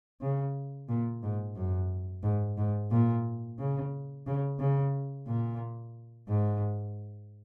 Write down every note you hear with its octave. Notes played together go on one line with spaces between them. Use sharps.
C#3
A#2
G#2
F#2
G#2
G#2
A#2
C#3
C#3
C#3
A#2
G#2